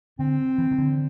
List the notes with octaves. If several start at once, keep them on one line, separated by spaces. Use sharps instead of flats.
D3 C4
E3
D#3
D3